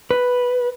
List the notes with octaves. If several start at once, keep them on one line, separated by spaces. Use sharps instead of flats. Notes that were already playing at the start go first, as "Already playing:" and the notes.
B4